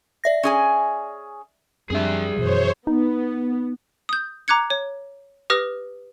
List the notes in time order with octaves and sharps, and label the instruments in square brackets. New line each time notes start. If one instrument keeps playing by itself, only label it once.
[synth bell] D5 E5 A#6
[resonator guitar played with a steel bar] C#4 G#4 G#5
[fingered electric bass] F#2 C4 D4 [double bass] G3 [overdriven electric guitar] G#4 E5
[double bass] F#2 E3 [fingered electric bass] B2 [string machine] C5 C#5
[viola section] B3 [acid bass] D#4
[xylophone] D#6 G6
A#5 D6 F#6 G#6 C#7
C#5
G4 B4 D#6 F6 A#6